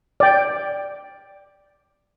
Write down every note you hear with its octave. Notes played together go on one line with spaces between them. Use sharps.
D5 G5